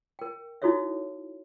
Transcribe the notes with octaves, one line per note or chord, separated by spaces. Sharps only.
A#4 G5
D#4 E4 F#4 A4 C#5 E5